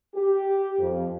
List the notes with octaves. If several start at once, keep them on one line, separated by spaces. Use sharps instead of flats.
G4
F2